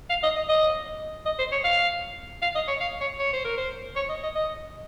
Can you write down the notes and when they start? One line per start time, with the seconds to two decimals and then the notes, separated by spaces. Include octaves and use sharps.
0.10 F5
0.23 D#5
0.36 D#5
0.49 D#5
1.25 D#5
1.39 C5
1.52 C#5
1.64 F5
2.42 F5
2.55 D#5
2.68 C#5
2.80 F5
3.01 C#5
3.19 C#5
3.33 C5
3.45 A#4
3.58 C5
3.96 C#5
4.09 D#5
4.23 D#5
4.35 D#5